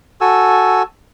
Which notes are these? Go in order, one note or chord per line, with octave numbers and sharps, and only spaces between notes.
F#4 A4 G#5 E6